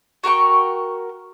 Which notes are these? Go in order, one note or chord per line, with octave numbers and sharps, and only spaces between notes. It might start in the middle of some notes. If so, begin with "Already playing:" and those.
F#4 A#4 G5 C#6